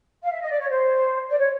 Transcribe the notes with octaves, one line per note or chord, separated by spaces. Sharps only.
F5
E5
D#5
D5
C#5
C5
D5
C#5